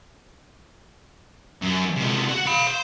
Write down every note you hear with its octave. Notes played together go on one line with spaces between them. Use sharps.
F#2
C3 G#3
F#4
F5 B5
C5